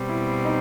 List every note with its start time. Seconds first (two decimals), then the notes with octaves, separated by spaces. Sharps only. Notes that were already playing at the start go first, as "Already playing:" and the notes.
Already playing: B2 G3 C4
0.09 E4
0.45 D#4